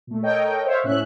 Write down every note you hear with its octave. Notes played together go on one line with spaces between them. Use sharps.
A#2 A3
A4 A#4 C#5 D#5 G5
C5 C#5 E5 F5
A2 C#4 E5 F#6